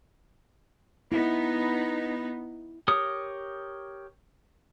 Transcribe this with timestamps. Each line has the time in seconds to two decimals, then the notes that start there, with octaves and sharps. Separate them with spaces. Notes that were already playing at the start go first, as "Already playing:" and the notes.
1.12 B3 D#4 E4
2.88 G4 A#4 C#5 D#6